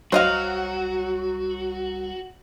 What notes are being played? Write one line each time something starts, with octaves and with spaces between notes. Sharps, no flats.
C2 F#3 F#4 C5 D#5 F5